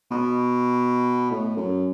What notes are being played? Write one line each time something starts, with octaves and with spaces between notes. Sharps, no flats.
B2
A2
F#2